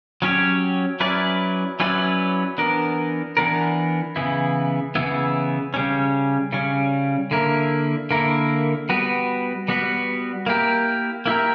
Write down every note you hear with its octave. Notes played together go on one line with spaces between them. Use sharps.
F#3 C#4 G4 C#5
F#3 C#4 E4 B4 D5
F#3 C#4 E4 B4 D5
E3 B3 D4 A#4
E3 B3 D4 A#4
C#3 E3 B3 E4
C#3 E3 B3 E4
C#3 G3 C#4
C#3 G3 C#4
D3 A#3 E4 A#4
D3 A#3 E4 A#4
G3 B3 F#4 B4
G3 B3 F#4 B4
A#3 E4 G4 A#4
A#3 E4 G4 A#4